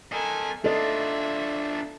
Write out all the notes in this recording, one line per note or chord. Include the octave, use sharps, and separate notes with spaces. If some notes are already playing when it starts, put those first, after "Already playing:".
A4 A#4 D#5 G#5
D4 F4 A4 D#5 E5